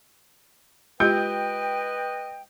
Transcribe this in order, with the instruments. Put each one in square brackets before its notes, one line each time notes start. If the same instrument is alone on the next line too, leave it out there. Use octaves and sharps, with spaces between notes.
[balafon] G#3 F4 G4 [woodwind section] B4 D#5 G5 [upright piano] G6